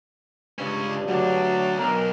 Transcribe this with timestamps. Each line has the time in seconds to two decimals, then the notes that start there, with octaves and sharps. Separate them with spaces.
0.59 C#2 G2 C#4
1.08 D2 F#3 D4
1.79 B1 A#4